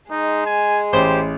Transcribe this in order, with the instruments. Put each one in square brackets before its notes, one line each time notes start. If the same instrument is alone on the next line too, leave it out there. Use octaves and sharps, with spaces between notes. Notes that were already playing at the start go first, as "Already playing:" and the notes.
[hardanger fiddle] G#3 [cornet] D#4
[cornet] G#5
[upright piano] A1 [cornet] G4 [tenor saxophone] C5